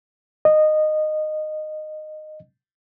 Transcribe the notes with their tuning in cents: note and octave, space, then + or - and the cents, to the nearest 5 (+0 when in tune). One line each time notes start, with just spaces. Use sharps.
D#5 -15